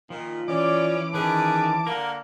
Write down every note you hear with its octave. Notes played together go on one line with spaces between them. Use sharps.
A#2 D#3 F3
E3 C#4 D5 D6
D#3 C#4 G#4 B4 A5
D3 A#3 A#4